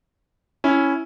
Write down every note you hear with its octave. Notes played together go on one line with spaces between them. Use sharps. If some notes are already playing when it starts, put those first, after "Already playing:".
C#4 E4